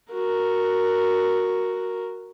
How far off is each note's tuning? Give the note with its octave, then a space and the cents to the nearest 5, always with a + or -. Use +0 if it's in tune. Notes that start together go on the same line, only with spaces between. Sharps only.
F#4 +0 A#4 +0